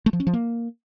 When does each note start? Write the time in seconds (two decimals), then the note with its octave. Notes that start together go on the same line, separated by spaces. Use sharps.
0.06 A3
0.13 F3
0.20 C#4
0.27 F3
0.33 A#3